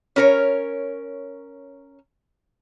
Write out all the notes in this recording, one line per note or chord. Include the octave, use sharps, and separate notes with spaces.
C#4 A#4 C#5